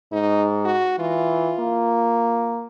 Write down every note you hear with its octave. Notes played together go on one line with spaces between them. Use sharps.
G#2 D#4
F#4
E3 F4
A#3